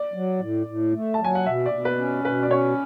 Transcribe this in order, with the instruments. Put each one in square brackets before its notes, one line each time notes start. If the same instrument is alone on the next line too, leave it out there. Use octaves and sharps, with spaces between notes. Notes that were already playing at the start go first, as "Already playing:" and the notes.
Already playing: [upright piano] D5
[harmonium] F#3
A2
A2
A3
[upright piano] A5
[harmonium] F#3
[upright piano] G#5
F#5
[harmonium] B2 [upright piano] E5
[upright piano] D5
[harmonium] B2
[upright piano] B4
[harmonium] C#4
[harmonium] B2 [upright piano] B4
[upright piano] D5
[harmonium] C#4 [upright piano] C#5